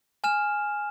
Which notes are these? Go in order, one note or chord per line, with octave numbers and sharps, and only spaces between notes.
G#5 F6 E7